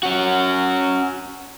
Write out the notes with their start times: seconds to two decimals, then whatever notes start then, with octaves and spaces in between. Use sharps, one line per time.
0.03 C#4 F#4